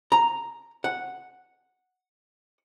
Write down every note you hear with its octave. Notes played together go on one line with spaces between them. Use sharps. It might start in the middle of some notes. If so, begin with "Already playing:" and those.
A#5
F#5